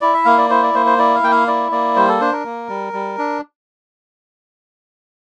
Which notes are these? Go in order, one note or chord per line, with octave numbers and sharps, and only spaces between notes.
E4 D5
E5
A#3 F5
D5
E4 C5
D5
A#3 C5
C5
E4 D5
F5
A#3 G5
F5
E4 D5
A#3 D5
G3 C5
A4
D4 C5
A#4
A#3
G3
G3
D4